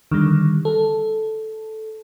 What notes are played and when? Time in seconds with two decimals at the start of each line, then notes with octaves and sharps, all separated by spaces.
0.11 D3 D#3 G3
0.65 A4